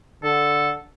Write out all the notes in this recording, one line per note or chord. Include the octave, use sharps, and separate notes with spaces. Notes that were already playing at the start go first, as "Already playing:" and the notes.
D3 A4